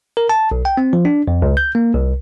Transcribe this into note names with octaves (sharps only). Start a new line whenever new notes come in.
A#4
A5
B1
G5
C4
F3
D4
F2
C#2
G6
A#3
C2